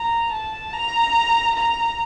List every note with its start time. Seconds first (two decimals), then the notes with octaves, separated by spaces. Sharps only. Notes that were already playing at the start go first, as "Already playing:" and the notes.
Already playing: A#5
0.32 A5
0.73 A#5
1.56 A#5